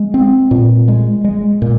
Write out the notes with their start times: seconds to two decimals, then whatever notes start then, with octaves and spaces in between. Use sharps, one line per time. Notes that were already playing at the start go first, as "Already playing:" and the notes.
Already playing: G#3
0.14 C4
0.51 A#2
0.88 G#3
1.24 G#3
1.62 A#2